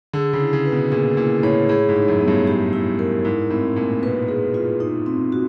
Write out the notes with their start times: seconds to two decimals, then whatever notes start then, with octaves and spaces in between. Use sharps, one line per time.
0.13 D3 G#4
0.33 C#3
0.40 E4
0.53 C#3
0.65 B4
0.72 B2
0.92 A#2 G#4
1.17 A#2 E4
1.43 A2 C#5
1.69 A2 G#4
1.89 G#2
1.96 D#4
2.08 F#2
2.21 B3
2.28 G2
2.47 G4
2.73 E4
2.99 A#4
3.25 G#2 E4
3.51 A2 C4
3.76 A#2 A3
4.02 B2 B4
4.28 G#4
4.54 F4
4.80 D#4
5.06 C4
5.32 F#4